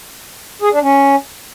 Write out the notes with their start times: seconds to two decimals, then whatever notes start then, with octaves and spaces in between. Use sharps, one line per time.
0.62 G#4
0.72 D4
0.82 C#4